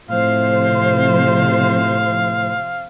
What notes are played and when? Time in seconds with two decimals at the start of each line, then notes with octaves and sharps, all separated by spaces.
0.10 A2 C3 F3 C5 F5